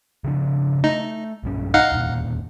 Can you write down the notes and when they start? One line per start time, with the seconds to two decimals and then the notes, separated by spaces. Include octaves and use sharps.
0.24 C#3 F3 D4
0.84 A3 D#4
1.44 B1 G2 C#4
1.74 D#4 F5 F#5
1.92 E1 A#2